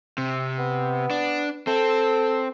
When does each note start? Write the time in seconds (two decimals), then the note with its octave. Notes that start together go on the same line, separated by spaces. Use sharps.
0.18 C3
0.59 B3
1.11 D4
1.67 C4 A4